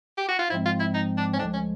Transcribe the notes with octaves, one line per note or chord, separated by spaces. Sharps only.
G4
F#4
F4
G#2 F3 G#3 C4 E4
F4
E4
D#4
D4
C#4
D2 D3 F3 G#3 D4
C#4